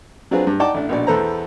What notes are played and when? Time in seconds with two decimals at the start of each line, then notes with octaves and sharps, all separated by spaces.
0.31 F#3 C4 D4 F4 G#4 B4
0.47 G2
0.60 D#4 D5 F#5 G5 A5 D6
0.74 A1 D4
0.89 A#1 B2 D5
1.07 E2 A4 B4 C5 A#5